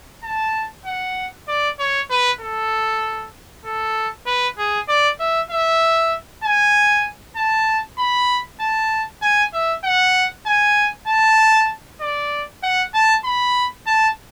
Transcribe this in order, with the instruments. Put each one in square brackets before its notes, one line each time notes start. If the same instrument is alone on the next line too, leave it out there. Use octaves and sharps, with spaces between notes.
[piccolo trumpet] A5
F#5
D5
C#5
B4
A4
A4
B4
G#4
D5
E5
E5
G#5
A5
B5
A5
G#5
E5
F#5
G#5
A5
D5
F#5
A5
B5
A5